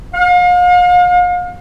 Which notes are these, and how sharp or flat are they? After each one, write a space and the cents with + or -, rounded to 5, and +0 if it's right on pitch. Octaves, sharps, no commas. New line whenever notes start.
F5 +40